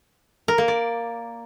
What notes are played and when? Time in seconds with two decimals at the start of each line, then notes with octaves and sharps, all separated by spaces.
0.48 A#4
0.58 A#3
0.68 D5